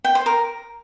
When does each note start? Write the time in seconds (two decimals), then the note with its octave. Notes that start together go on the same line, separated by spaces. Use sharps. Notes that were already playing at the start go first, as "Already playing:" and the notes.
0.04 G5
0.15 C5
0.26 A#4